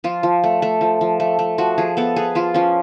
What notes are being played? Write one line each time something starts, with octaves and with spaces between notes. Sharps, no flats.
F3 F4
F3
A3
A3
F3
F3
A3
A3
F3 F#4
F3 G#4
B3 A4
B3 G#4
F3 F4
F3 C#4